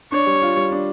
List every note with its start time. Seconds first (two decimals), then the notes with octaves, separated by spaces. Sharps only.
0.12 D4 C#5
0.27 G3
0.42 F4
0.56 G3
0.72 D4